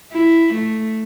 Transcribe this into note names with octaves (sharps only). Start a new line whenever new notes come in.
E4
A3